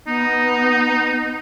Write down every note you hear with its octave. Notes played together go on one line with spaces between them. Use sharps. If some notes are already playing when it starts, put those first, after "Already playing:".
B3 D#4